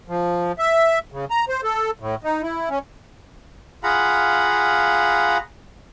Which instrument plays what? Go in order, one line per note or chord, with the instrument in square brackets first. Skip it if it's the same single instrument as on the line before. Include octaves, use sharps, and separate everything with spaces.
[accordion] F3
E5
C#3
A#5
C5
A4
A2
D#4
E4
C#4
[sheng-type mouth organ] F4 G#4 F5 F#5 A#5 B5